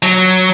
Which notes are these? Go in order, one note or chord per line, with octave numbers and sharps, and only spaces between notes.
F#3